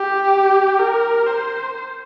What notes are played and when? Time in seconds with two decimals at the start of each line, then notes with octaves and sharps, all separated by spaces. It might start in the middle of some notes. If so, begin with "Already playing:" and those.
Already playing: G4
0.79 A#4
1.27 C5